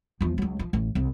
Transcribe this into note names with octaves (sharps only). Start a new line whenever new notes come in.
E2 F3
C#2 F#3
F3
A1
C2